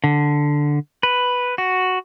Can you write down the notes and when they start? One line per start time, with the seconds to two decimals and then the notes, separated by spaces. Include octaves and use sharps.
0.04 D3
1.03 B4
1.58 F#4